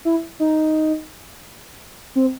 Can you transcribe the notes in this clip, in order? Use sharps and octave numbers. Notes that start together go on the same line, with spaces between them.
E4
D#4
C4